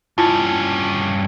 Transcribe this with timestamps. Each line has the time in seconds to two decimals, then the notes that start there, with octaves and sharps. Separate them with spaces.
0.18 G2 C#4 E4 F4 A5